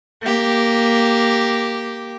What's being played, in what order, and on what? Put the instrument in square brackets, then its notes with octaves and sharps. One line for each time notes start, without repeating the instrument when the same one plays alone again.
[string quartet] A#3 G4